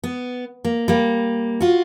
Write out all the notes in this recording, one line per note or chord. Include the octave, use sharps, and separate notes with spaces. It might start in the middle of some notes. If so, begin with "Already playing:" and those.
B3
A#3
G3 A#3
F4 F#4